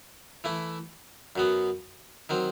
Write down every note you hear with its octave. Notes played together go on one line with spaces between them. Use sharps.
E3 A3 E4
F#2 F#3 B3
D#3 F#3 C4